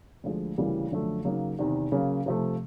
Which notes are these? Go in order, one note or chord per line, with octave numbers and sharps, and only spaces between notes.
D2 D3 F3 G#3
D2 C#3 E3 G3 A#3
F#2 D3 F3 A3
C#3 F#3 A#3 D#4
E2 C3 D#3
C#3 F#3 A#3 C#4
C3 F3 A3